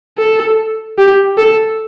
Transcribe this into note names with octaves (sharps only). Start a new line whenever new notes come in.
A4
G4
A4